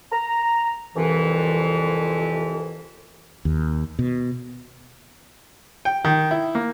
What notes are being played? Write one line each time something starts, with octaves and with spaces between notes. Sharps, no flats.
A#5
C2 F2 E3
D#2
B2
G5
D#3
E4
A#3